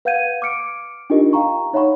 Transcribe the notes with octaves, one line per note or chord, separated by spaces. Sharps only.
B4 F5 F#5 G6 G#6 D#7
D6 F6 C#7 D7
D4 D#4 F4 G4 A#4 D#5
F5 G5 A#5 C#6
D#4 C#5 E5 F#5 B5 C#6